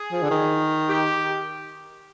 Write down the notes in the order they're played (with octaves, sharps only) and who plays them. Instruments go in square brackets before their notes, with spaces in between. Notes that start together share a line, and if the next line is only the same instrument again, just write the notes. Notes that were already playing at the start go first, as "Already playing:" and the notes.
Already playing: [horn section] G#4
[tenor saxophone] F3
D3
D#3
[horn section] G4